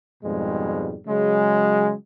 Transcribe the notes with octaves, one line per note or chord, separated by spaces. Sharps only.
F2 G#2 B2 G3 G#3
C#3 F#3 G#3